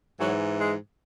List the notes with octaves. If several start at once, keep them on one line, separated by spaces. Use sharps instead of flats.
G#2 E3 F#3
G#3